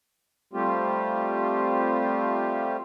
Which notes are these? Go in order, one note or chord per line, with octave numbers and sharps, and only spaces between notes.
G3 A3 C4 F4 G4